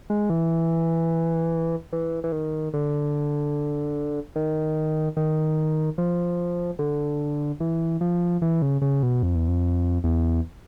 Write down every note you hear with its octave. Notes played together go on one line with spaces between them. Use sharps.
G#3
E3
E3
E3
D#3
D3
D#3
D#3
F3
D3
E3
F3
E3
C#3
C#3
B2
F2
E2
F2
E2